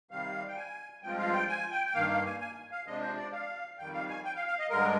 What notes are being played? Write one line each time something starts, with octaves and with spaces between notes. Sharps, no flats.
C3 D#3 G3 F5
G5
G#5
G2 F3 G#3 C4 F4 G5
F5
G5
G#5
G5
G5
G2 D#3 A#3 F5
F5
G#5
G#5
F5
C3 F3 G#3 D4 D#5
C5
D5
F5
F2 D#3 G3 G5
F5
G#5
G5
F5
F5
D#5
G2 D3 G#3 A#4